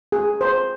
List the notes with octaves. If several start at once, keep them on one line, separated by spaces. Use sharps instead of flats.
G#4
C5